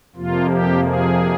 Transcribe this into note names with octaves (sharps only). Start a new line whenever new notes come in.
F2 C3 F3 A#3 F4
G4
G#4